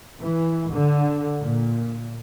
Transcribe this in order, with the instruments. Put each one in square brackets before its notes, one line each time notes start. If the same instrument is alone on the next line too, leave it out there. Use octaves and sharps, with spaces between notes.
[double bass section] E3
D3
A#2